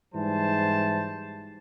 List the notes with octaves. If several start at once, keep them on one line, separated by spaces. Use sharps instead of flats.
G#2 E3 G3 C5 A5